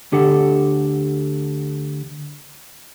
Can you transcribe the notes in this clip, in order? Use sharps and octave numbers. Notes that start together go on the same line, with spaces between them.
D2 D3 G4 A4 F#5